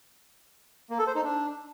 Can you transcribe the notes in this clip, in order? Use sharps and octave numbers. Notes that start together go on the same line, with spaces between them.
A#3
A4
C5
D#4
D4